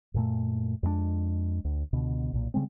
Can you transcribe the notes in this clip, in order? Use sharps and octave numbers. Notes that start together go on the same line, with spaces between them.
F#2 A#2 A3
F2 G#3 A3 D4
D2
C#2 B2 D3
B1 A#2
C#3 G3 G#3 C4